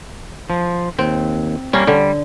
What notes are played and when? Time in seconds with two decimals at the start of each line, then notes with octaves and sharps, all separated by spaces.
0.50 F3
0.99 D#2 C4
1.73 G3 A#3 C#4
1.87 D3 G3